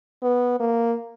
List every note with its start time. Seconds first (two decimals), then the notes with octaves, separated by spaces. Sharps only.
0.22 B3
0.60 A#3